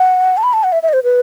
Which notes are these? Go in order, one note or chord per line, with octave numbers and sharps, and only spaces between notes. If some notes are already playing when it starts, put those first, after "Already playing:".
Already playing: F#5
A5
B5
A5
F#5
E5
E5
D#5
C5
B4